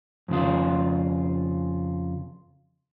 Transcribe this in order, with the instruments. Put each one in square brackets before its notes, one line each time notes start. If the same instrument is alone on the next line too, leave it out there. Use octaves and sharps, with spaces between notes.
[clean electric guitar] F2 C#3 F4